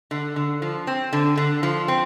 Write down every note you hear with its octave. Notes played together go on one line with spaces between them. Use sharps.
D3
D3
F3
C4
D3
D3
F3
C4